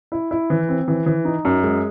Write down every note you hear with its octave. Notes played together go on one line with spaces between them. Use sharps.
E4
E4
E3
C4
E3
E3
D#4
F#2
G#3